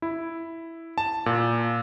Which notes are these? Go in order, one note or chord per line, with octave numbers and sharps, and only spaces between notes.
E4
A5
A#2